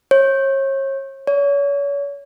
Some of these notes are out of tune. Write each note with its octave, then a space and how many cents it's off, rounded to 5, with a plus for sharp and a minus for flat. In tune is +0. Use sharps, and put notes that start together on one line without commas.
C#5 -35
C#5 +35